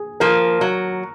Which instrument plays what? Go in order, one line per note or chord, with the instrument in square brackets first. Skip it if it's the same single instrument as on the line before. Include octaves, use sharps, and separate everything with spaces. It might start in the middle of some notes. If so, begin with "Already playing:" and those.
Already playing: [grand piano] G#4
[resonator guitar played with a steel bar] F3 A#3 [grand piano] A#4
[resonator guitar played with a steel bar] F#3